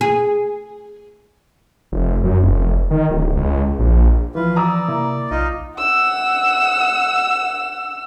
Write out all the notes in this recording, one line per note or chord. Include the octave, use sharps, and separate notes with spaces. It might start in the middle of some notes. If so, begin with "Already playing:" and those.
G#4
F1
F#2
F1
D#3
D1
C#2
A#1
E3 F3 F4 B4
D5 A#5 D#6 E6
C3 A#3 E4
B1 D#4 F4 D#5
F#5 E6